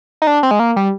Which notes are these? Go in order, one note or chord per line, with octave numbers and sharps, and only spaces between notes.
D#4
D4
C4
G#3
A#3
G3